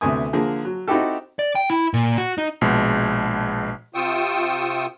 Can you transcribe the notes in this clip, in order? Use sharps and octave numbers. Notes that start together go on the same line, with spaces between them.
D2 C3 B3 G#5 D#6
D3 F3 A#3 G#4
F#3
C4 D#4 E4 F#4 G4 A4
D5
G5
E4
A#2
F#4
D#4
A#1 B2 G#3
C3 F4 G5 C#6 D#6 E6